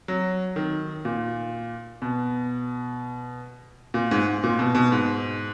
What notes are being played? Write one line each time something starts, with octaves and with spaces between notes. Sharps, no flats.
F#3
D#3
A#2
B2
A#2
G#2
A#2
B2
B2
G#2